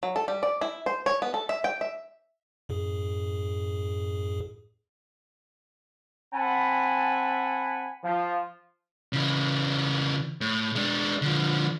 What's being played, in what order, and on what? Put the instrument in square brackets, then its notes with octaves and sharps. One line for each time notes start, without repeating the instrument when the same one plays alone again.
[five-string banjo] F#3
A4
G3
D5
E4
C5
C#5
B3
A4
E5
G5
E5
[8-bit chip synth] F#2 A2 G#4
[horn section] C4 F#5 G#5 A5 B5
F3
[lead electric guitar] C#3 E3
A2
G#3 D4
D3 F3